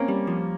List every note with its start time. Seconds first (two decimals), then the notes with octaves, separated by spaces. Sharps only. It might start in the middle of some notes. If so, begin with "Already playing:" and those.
Already playing: A#3 C4 C#4
0.08 G3
0.27 F3